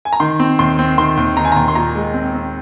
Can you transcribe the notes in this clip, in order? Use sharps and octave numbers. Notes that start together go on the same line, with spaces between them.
G#5
A#5
D#3 C6
C4
D#2 C6
C4
D#3 C6
D#2
D#3 A#5
G#5
D#2 A#5
C6
A#2 A#5
G#3
C4
C4